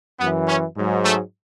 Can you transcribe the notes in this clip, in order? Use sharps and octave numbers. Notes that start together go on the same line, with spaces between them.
F#2 E3 B3
C#4
G#2 F#3
A3